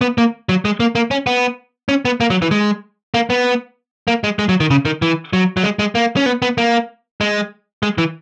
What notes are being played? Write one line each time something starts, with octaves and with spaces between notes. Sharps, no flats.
B3
A#3
F#3
G#3
A#3
A#3
C#4
B3
C#4
B3
A#3
F#3
E3
G#3
A#3
B3
A#3
G#3
G#3
F#3
D#3
C#3
D#3
E3
F#3
F#3
G#3
G#3
A#3
C#4
B3
B3
A#3
G#3
G#3
E3